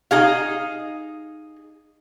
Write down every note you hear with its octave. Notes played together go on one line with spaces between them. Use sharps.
D#4 G#4 F5